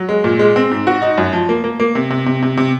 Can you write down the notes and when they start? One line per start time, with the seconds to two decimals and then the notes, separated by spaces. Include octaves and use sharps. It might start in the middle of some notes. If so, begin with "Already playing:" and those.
Already playing: F#3
0.09 G#3
0.24 A#2
0.39 G#3
0.56 C4
0.71 G#2
0.87 F#4
1.02 D#4
1.18 F#2
1.33 F3
1.49 A#3
1.64 A#3
1.80 A#3
1.95 C3
2.10 C3
2.26 C3
2.42 C3
2.57 C3